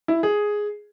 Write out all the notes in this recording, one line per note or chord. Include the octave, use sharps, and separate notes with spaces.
E4
G#4